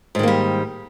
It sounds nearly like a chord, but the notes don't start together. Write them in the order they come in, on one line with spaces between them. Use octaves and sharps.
G#2 D#3 A#3 G3